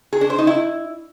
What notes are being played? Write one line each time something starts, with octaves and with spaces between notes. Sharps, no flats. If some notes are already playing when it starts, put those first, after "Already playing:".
G#4
D4
C5
D#4
E4